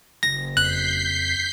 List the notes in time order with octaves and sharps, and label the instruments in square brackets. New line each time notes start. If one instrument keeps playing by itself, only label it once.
[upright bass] F#1 [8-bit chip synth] A#6
[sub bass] F2 [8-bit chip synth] F#6 [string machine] G6 B6 C7